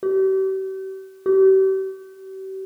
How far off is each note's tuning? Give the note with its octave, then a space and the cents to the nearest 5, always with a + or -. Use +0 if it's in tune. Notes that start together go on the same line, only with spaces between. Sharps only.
G4 -40
G4 -40